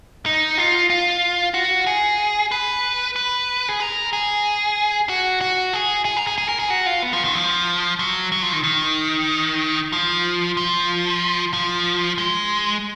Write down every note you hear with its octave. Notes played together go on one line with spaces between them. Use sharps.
D#4
F4
F4
F#4
G#4
B4
B4
G#4
A#4
G#4
F#4
F#4
G#4
G#4
A#4
G#4
G#4
A#4
G#4
F#4
F4
B3
F3
D#3
F3
F#3
F#3
F3
D#3
D#3
F3
F3
F3
G#3